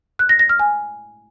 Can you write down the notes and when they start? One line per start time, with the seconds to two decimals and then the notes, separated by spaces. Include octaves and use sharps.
0.19 F#6
0.29 A#6
0.39 A#6
0.49 F6
0.59 G#5